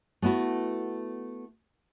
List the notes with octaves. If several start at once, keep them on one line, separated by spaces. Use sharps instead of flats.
A3 B3 E4 F#4